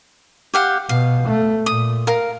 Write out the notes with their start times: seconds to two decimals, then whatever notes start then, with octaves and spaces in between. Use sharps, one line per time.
0.54 G4 F5 F#5
0.89 B2 F5
1.27 A3
1.66 A#2 D#6
2.07 A#4 F5